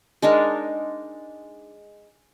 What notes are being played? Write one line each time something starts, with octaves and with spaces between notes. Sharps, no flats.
G#3 D4 D#4 A#4